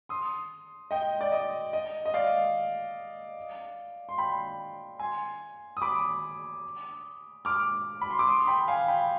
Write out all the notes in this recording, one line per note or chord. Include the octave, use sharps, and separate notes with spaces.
C6 D#6
D#5 G5
D5
D#5
D#5
D#5
D5 F5
C6
G5 B5
G#5 C6
D#6
B5 D6
D6 F6
B5
C6
D6
C6 D#6
C6
G5 B5
F5 G#5
G5 B5